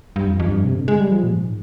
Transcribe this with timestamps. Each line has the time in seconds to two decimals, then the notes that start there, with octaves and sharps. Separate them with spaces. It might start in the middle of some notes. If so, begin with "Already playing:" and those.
0.16 G2
0.28 F2
0.40 F2
0.45 G2
0.64 C3
0.75 D3
0.88 G#3
1.00 G3
1.12 F3
1.24 A#2
1.35 G#2